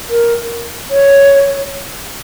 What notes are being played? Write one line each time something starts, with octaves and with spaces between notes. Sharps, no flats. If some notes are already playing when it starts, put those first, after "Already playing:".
A#4
C#5